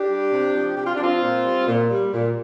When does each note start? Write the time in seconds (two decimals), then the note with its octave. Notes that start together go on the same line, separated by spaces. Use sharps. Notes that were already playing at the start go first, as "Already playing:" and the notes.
Already playing: D4 G4
0.09 G3
0.31 C3
0.55 F3
0.76 C3 G4
0.85 F4
0.94 D4
1.00 F3 C4 F4
1.22 A#2
1.45 G3
1.67 A#2
1.90 G3
2.12 A#2